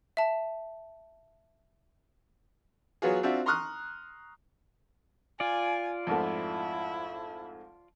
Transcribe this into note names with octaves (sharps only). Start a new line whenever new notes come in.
E5 A5
F#3 B3 F4 F#4 G#4
C4 D4 F4 F#4 E5
A#5 C6 C#6 D#6 F6 F#6
F4 D5 G#5
F2 G#2 A3 E4